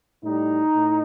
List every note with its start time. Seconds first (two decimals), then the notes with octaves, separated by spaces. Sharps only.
0.24 A2 G3 D#4
0.74 A2